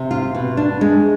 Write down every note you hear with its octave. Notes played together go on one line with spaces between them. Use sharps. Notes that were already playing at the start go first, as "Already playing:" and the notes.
Already playing: C3
F4
B2
D4
G#3